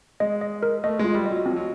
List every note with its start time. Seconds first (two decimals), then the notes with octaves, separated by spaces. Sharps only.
0.20 G#3 D#5
0.41 D#5
0.63 A#4
0.84 A3 D#5
0.99 G#3 F4
1.15 G3
1.26 F#3 D#5
1.46 F3 C4
1.56 F#3